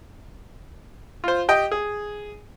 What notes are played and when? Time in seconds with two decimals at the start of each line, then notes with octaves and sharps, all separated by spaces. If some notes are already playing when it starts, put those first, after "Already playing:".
1.24 F4 C5
1.48 G4 D#5 G5
1.72 G#4